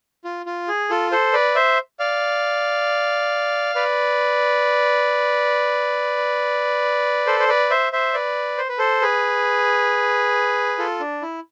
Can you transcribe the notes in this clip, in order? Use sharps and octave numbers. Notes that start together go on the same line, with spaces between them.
F4
F4
G#4
F4 A4
A4 C5
B4 D5
C5 E5
D5 F5
B4 D5
A4 C5
C5
B4 D5
C5 E5
C5 E5
B4 D5
C5
B4
A4 C5
G#4 B4
F4 A4
D4
E4